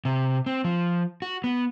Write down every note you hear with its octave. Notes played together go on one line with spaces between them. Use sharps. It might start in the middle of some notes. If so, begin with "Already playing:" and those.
C3
C4
F3
F#4
B3